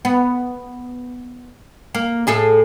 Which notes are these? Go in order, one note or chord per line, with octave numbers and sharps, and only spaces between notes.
B3
A#3
A2 G#4 A4